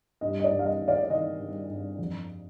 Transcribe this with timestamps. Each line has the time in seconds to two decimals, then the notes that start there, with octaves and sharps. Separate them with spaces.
0.21 G2 D#5
0.40 D#5
0.44 D5
0.51 G2
0.59 F5
0.66 D#5
0.81 D#3
0.88 D5 F5
1.03 D5
1.10 D#3 D#5
1.40 G2
1.70 G2
1.99 F2